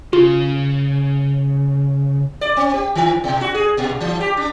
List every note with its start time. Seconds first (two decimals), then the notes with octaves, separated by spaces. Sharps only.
0.13 C#3 F4
2.41 D5
2.57 C4
2.74 G4
2.95 D#3
3.24 B2
3.41 F#4
3.54 G#4
3.77 A#2
4.01 E3
4.21 G4
4.37 D4